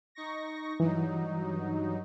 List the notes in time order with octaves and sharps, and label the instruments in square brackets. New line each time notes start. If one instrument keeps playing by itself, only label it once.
[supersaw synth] D#4 C#6 A#6
[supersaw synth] G2 F#3 D#4 [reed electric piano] E3